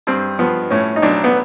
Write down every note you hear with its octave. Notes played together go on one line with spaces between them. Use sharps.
G2 C4
F3 B3
A2 C#4
D#4
B1 D4
B3